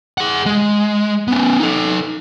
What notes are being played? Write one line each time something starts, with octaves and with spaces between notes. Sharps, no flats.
G#4 F#5
G#3
B3 C#4
D#4 A4